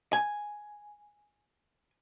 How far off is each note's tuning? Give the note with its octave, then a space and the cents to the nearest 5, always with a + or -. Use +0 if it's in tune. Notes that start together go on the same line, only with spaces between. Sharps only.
G#5 +0